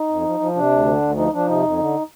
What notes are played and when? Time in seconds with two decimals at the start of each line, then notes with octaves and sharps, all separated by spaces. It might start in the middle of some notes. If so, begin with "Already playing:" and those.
Already playing: D#4
0.09 F2
0.25 F3
0.40 F3
0.55 C3 D4
0.71 D2
0.86 D3
1.02 D2
1.17 F3 D#4
1.33 F3 D4
1.48 C3 D#4
1.63 F2
1.79 D3